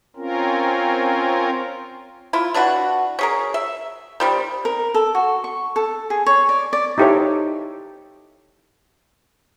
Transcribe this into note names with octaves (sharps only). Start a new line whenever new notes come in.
C4 C#4 F4 A#4
E4 F4
E3 D4 E4 F#4
C#4 G#4 A#4
E5
D#3 G3 C4
A#4
A4
F#4
C#6
A4
G#4
C#5
D5
D5
D#4 E4 G4 A4 C5 C#5